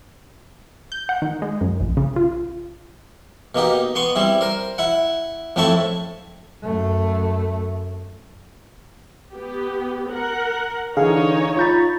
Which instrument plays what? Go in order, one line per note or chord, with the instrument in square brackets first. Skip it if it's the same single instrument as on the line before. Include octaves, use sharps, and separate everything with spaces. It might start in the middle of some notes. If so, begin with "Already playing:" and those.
[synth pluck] G6
F#5
D#3
G#3
F#2
A#1
C#3
F4
[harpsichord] B2 A#3 D#4 G4
B3 C6 C#6
G3 C4 E4
A#4 C5
E4 F#5
F2 A2 C4 E4 A5 C#6
[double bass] F#2 A3
[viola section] B3 G4
A#4 F#5
[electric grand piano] D3 E3 [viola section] D#4 C#5 [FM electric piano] G#4 F5
[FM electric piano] F4 A#5 B5 [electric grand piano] C#6 G6 A6